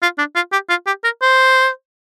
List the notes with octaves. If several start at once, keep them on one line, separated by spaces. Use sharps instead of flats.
F4
D4
F4
G4
F4
G4
A#4
C5